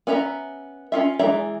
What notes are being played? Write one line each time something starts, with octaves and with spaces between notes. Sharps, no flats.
B3 C#4 E5 A#5
C#4 F4 E5
E3 G#3 D5 E5 A#5